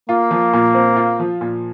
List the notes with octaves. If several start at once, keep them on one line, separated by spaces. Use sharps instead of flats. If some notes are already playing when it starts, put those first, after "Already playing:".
A#3 F4
F3
A#2
C4
F4
F3
A#2